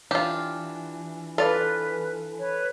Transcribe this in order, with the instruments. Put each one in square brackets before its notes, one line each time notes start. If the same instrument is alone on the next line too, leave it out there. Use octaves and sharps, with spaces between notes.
[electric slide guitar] E3 D4 [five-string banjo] F4 G4
[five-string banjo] F4 D5 [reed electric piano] A4 [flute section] B4
[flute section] B4 C#5